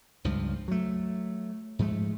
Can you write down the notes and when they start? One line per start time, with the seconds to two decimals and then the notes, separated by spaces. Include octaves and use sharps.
0.24 C#2 G2 F3
0.68 F#3 A3
1.79 G#2 F3 G#3 A3